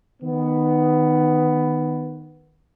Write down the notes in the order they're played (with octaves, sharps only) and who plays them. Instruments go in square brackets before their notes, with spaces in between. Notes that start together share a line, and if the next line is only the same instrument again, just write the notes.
[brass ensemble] D#3 B3